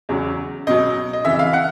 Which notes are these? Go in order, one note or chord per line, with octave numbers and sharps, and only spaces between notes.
E2 C#3 F#3
C#2 B2 F#3 D#5
D#5
F2 C#3 E3 E5
E5
F5
F#5